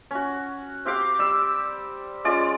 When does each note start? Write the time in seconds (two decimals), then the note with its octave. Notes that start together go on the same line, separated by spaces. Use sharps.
0.11 C#4 F#4
0.85 C4 G4 F5 D6
1.19 G3 E6
2.24 G#3 C#4 F4 D5